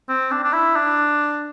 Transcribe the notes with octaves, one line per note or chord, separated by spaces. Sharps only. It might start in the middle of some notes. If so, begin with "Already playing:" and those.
C4
D4
D4
E4
D4